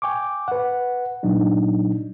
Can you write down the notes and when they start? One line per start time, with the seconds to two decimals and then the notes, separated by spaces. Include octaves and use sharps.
0.02 G5 G#5 C#6 D6
0.48 B4 F#5
1.23 A#2 F#3 D4 D#4